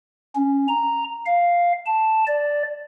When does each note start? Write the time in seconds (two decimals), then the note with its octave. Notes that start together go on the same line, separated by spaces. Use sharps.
0.36 C#4
0.68 A#5
1.26 F5
1.86 A5
2.27 D5